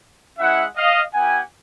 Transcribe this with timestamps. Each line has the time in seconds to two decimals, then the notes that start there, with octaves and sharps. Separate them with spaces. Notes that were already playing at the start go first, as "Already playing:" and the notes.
0.39 G#3 C#4 E4 E5 F#5
0.76 D#5 F5
1.13 B3 E4 G4 F#5 G#5